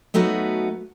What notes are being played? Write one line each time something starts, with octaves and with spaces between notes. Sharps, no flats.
F#3 A3 B3 D#4 F#4